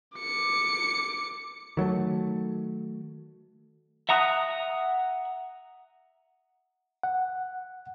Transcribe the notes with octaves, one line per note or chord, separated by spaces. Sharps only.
D6 C#7
D#3 F#3 G3 A3
E5 F#5 A#5 D#6 F#6
F#5